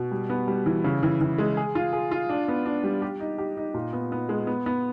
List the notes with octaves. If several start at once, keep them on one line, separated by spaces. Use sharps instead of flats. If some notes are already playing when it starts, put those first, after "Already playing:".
Already playing: B2
G3
B3
G3
E3
C#3
E3
E3
G#3
G#4
F4
G#4
F4
D4
B3
D4
G3
G4
D#4
G4
D#4
A#2
B3
B3
G#3
B3
B3